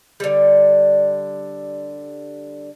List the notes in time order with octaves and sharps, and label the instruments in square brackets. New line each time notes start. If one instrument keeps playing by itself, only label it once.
[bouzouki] D3 G3